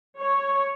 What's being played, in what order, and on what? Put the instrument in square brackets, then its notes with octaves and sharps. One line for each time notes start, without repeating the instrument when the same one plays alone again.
[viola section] C#5